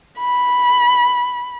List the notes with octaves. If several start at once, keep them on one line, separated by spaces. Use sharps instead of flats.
B5